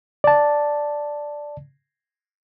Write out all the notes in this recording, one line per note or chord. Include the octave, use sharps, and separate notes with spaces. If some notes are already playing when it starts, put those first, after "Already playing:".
D5 A5